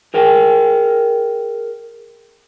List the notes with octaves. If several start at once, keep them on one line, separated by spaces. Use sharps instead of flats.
G#4 A#4 G5